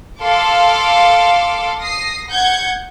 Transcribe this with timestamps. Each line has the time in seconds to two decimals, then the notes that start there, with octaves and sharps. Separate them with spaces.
0.21 A4 F5 C6 D6
1.80 D#6 A#6 C7
2.29 F#5 G6 G#6